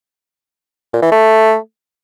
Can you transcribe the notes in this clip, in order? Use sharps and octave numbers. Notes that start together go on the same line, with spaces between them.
A#2
E3
A3